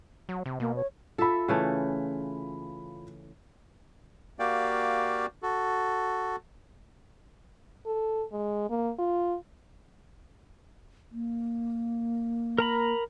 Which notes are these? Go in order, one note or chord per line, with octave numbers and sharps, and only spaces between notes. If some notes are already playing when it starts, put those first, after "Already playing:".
F#3
C3
B2 A#3
C#5
F4 A4 E5 B5
C#3 E3 A3
A#3 F#4 G4 D5 F5 G5
F#4 A4
A4
G#3
A#3
F4
A#3
A#4 A#5 B5